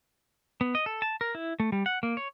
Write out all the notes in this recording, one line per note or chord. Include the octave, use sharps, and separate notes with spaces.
B3
D#5
A4
A5
A#4
E4
A3
G3
F#5
A#3
C#5